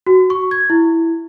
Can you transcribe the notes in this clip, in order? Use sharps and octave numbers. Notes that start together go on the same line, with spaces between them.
F#4
C#6
G#6
E4